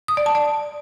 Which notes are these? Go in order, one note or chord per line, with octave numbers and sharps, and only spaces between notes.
D#6
D5
A5
D5